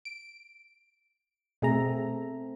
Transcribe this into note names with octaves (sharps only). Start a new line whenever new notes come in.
D7
B2 A3 C4 G#4 E5 A#5